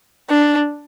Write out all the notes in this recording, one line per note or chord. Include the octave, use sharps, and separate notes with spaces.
D4